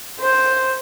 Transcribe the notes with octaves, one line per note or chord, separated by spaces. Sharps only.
C5